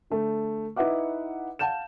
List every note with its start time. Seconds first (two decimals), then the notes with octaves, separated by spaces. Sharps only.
0.10 D3 A3
0.76 D#4 E4 B4 E5 F#5 D6
1.59 F5 F#5 A5 G6 E7